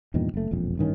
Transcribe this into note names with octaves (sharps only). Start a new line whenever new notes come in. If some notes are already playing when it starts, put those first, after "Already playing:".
E2 G2 A#2 D#3
F#1 A3
E1 A#1 F2
A1 G2 D#3 C#4